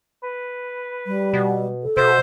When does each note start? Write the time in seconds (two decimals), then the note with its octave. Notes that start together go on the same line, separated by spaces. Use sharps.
0.23 B4
1.07 G3
1.33 B2
1.83 A4
1.97 B2 C5 E5